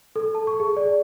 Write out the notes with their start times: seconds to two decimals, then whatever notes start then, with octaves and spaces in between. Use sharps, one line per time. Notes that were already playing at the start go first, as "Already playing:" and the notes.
0.16 A4
0.35 A5
0.47 C#6
0.60 G#4
0.77 D5